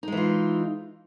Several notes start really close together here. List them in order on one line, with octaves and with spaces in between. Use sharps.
D#4 G#3 E3 F4